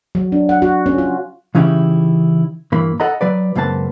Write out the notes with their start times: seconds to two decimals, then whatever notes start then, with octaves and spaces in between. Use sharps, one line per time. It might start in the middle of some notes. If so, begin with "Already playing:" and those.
0.15 F#3
0.32 D4
0.49 F#5
0.62 F#4
0.86 C#4
0.98 F4
1.55 C#3 E3 C#4 D#4 E4 G4
2.72 G2 E3 A#3 B5
3.00 A4 D#5 F#5 A#5 B5
3.21 F#3 B4 D5
3.55 C#2 F#2 A#3 C4 B4 A5